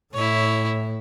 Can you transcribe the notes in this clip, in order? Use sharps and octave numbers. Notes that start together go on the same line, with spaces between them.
A2 E4 C#5